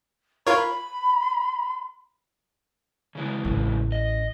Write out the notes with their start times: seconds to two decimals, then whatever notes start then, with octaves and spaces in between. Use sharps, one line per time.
0.47 F4 A#4 C#5 B5
3.15 C#3 E3 G#3
3.45 A1
3.92 D#5